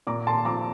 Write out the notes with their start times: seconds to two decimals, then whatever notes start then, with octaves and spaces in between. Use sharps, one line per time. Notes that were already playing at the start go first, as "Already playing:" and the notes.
0.07 A#2 A#5 D6
0.27 A5 C6
0.45 F3 A#5 D6